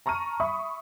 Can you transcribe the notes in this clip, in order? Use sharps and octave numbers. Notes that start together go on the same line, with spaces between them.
A5 A#5 C#6 F6 D#7
E5 B5 C#6 D#6